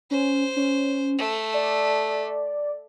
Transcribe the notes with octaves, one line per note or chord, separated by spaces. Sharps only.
C#4 C5
C#4
A3
D5